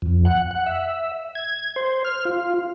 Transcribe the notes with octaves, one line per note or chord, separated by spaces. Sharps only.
F2
F#5
F#5
E5
G#6
C5
F6
F4